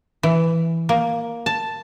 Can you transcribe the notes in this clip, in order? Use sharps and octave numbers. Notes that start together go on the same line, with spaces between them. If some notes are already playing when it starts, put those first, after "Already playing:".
E3
A#3
A5